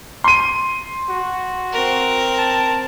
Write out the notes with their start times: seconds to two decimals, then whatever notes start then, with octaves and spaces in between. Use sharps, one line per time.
0.24 C6 D#7
1.10 F#4
1.73 C4 A#4
2.38 A5